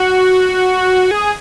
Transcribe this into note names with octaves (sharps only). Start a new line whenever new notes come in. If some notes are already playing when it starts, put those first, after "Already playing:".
Already playing: F#4
G#4